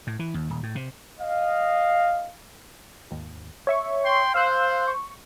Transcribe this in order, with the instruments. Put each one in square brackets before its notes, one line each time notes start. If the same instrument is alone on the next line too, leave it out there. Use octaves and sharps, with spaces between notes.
[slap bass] A2
E3
D#2
D#1
A2
C3
[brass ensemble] D#5 F5
[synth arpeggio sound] G#1 D#2
C#5 E5 C#6
[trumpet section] G5 C6
[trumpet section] C5 [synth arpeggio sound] F5 E6 F#6
[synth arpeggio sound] C#6